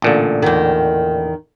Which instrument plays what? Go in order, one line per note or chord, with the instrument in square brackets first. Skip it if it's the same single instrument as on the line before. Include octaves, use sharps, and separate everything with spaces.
[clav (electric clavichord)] A1 A#2 D3
[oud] E2 D#3